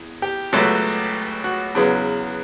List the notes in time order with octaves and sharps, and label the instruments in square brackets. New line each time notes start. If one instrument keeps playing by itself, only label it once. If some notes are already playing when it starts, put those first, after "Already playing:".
Already playing: [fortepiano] E2
G4
C#2 B2 F#3 A3
F#4
E2 C#3 F#3 B3